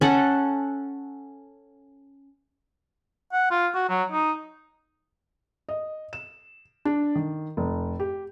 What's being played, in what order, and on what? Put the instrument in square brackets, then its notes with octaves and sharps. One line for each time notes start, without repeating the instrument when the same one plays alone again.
[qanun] C#4 A4 F#5
[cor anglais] F#5
F4
F#4
F#3
D#4
[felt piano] D#5
E7
D4
D#3
F1
G4